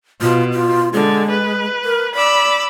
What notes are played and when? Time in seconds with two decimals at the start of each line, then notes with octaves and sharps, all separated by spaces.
0.22 B2 F4
0.53 F4
0.93 D3 G#3
1.29 B4
1.85 A#4
2.15 D5 B5 D6 E6